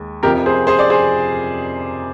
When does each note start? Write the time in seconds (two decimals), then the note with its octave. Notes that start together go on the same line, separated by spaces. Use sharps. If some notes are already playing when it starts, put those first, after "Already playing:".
Already playing: D#2 G#3
0.23 F1 F2 C3 F3 G4 A#4
0.46 G#4 C5
0.67 G#4 C5
0.79 D5
0.90 G#4 C5